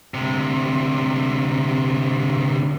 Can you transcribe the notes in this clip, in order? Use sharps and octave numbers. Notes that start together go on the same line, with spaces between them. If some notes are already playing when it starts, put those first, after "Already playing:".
D2 C3